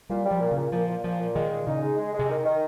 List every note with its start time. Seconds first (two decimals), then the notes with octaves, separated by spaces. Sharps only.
0.09 A#2 G3
0.25 G3
0.31 F3
0.40 A#2
0.51 C#3
0.56 A#2
0.72 A#2 F3
0.88 A#2
1.04 A#2 F3
1.19 A#2
1.35 D#3 G#3
1.51 A#2
1.67 C#3 D#4
1.82 G#3
1.98 G#3
2.14 G#3
2.19 C3
2.30 D#3
2.45 D#3